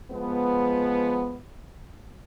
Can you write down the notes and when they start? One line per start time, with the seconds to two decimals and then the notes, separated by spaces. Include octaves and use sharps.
0.11 F3 G#3 B3